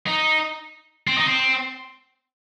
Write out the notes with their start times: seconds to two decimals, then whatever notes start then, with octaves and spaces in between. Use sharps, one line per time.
0.07 D#4
1.07 C4
1.17 D#4
1.27 C4